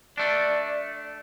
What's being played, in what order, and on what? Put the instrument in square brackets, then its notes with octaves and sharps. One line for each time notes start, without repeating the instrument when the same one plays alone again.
[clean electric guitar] A3 D4 [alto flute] D5